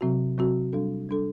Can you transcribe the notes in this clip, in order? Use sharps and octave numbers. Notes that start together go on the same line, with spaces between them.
C3 F#3 C4 F#4
C3 F#3 C4 F#4
G3 D4 A4
G3 D4 A4